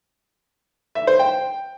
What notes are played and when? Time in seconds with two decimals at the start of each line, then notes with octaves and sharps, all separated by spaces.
0.95 E5
1.07 C5
1.19 G5